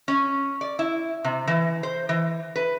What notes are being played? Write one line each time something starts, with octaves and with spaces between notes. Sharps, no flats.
C#4
D5
E4
C3
E3
C5
E3
B4